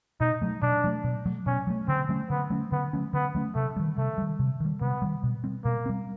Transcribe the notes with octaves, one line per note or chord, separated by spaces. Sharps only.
B2 D#4
F#3 A3
B2 D4
F#3 A3
B2
F#3 A3
B2 C#4
F#3 A3
D3 C4
F#3 A3 C#4
D3 B3
F#3 A3 C#4
D3 B3
F#3 A3 C#4
D3 B3
F#3 A3 C#4
C3 A3
D#3 G3
C3 A3
D#3 G3
C3
D#3 G3
C3 B3
D#3 G3
B2
G3 C4
B2 A#3
G3 C4